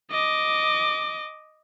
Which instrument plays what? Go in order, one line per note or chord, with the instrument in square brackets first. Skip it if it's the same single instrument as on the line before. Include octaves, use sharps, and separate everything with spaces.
[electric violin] D#5 D6